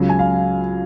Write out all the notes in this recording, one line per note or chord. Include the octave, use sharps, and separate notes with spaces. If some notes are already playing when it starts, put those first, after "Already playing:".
Already playing: C#2 C#3 F#3
G#5
F5